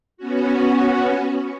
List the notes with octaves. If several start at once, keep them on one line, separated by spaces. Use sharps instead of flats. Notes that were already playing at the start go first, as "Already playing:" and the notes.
B3 C#4 F#4